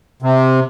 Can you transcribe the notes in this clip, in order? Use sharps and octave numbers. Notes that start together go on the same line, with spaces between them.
C3